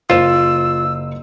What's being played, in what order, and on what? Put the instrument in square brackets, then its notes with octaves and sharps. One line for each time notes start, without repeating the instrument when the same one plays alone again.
[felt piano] F#1 C5 E7 [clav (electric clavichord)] F4 [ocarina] E6